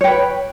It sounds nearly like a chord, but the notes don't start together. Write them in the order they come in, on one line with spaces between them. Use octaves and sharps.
C#5 G5 B4